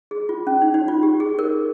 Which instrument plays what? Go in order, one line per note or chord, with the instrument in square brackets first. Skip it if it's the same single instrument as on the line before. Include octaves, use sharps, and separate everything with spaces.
[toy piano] G#4
F4
C#4
D#4
D#4
F4
G4
G#4
A#4